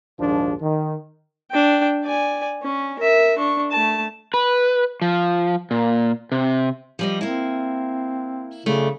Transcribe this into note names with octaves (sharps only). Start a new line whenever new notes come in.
A#1 D#2 G#2 F3 D4
D#3
D4 G5
D5 G#5
C#4
A#4 E5
D4 C#6
A3 A5
B4
F3
A#2
C3
F3 G3 D#5
A#3 C4 E4
F#2 C#3 A3 D4